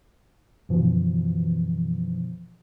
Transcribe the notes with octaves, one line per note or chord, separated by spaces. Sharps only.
F#2 B2 D3 E3 F3